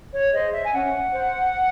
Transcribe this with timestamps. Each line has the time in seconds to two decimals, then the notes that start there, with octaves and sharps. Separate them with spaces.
0.12 C#5
0.32 G#4 C5 D#5
0.53 E5
0.65 G#5
0.73 C#4 F#5
1.14 C5